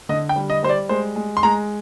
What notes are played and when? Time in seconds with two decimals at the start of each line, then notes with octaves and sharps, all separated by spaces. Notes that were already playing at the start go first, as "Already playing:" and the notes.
0.09 D3 D#5
0.29 G5
0.36 G3
0.50 D#5
0.63 G3 C5
0.69 D5
0.89 G#3 C5
1.16 G#3
1.37 C6
1.43 G#3 A#5